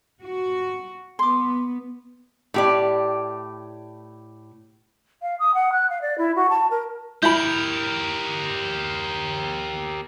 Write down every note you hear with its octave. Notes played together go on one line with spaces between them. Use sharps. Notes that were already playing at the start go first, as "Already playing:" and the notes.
F#4
B3 C6 D6
A2 G4 D5
F5
D#6
F#5
F#6
F5
D5
E4
F#4
A5
A#4
E4 G4 A#4 B5 G6